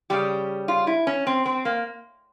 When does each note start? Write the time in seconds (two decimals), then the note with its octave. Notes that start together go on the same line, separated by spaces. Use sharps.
0.10 C#3 G3 G4
0.68 F4
0.87 E4
1.07 C#4
1.27 C4
1.46 C4
1.65 A#3